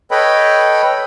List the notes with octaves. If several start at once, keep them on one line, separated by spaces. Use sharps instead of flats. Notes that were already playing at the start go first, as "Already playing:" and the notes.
A4 B4 C#5 D#5 G5 B5